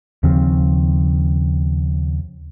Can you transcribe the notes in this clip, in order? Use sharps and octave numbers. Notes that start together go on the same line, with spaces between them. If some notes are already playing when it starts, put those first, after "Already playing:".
D#2 C#3 F3 C4